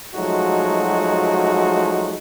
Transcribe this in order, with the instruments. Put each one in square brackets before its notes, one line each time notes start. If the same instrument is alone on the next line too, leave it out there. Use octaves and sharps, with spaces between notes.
[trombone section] F3 F#3 G#3 A3 D#4 F#4